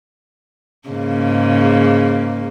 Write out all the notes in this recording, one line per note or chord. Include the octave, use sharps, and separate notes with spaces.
G#2 C#3 A#3